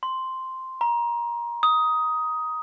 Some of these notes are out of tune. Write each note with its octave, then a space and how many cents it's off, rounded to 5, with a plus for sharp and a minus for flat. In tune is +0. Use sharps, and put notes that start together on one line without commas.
C6 -5
A#5 +25
D#6 +15